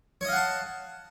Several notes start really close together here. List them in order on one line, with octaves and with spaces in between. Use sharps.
C#5 D#5 F5 F#5 A5